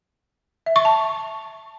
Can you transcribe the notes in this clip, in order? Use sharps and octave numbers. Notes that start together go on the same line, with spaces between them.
E5
C#6
A5